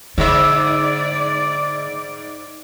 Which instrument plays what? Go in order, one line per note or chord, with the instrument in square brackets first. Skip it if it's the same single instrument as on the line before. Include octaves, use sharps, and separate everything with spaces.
[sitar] G#2 E5 [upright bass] D3 [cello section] D5